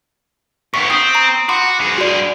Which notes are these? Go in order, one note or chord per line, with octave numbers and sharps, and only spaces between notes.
G2 B3 C#6
C4 D#6
A#5
F#4 B5 C6 D6
G2 G#4
F#4 D5